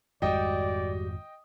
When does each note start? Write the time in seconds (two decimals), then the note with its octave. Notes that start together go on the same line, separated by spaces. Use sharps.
0.22 G#1 F2 G3 G#3 F#4 D5 D#5 G5